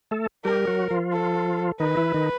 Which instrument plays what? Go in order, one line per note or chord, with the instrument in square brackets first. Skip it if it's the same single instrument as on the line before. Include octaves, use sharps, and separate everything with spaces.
[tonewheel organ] A3 A4
[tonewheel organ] G3 G4 [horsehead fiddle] A#4
[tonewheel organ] F#3 F#4
F3 F4
[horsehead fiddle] A4
[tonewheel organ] D#3 D#4 [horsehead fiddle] B4
[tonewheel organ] E3 E4
D#3 D#4